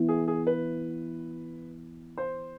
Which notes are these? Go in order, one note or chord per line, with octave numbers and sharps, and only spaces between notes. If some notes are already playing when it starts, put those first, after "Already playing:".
Already playing: E3 B3 E4
G#4
G#4
B4
C5